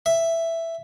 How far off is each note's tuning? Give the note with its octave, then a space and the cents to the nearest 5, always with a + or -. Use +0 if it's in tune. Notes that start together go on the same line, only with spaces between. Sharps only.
E5 +5